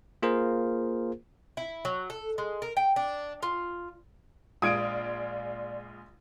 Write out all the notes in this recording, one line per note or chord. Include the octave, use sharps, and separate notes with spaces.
A#3 F4 G#4 A#4 C5
E4
F#3
A4
G#3
A#4
G5
D4
F4
A#1 G#3 F4 D5 D#6 G#6 D7